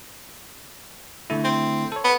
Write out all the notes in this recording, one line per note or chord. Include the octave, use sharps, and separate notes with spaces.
D3 A3 E4
C4
A4 C#5
B3